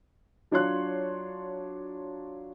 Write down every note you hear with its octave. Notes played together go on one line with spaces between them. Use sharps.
F#3 D4 F4 C#5 C6 F#6